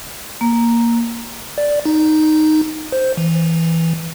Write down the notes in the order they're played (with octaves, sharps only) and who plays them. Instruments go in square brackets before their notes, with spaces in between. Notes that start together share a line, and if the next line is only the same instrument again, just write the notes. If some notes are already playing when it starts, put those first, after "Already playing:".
[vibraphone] A#3
[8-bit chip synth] D5
D#4
C5
E3